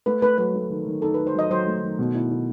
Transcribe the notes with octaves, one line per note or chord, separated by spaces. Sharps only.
A3 B4
A3 B4
F#3 B4
A3
D#3
D#3
D#4 A4
D#4 B4
C5
F#3 D#5
F#3 C5
A3
D#3
B2
E4
E4